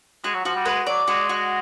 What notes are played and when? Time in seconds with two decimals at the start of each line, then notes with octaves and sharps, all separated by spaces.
0.24 G#3 F#4
0.34 F#3
0.45 F3 F#4
0.55 G3
0.66 G#3 B4
0.87 F#3 D5
1.08 G#3 F#4
1.29 F#4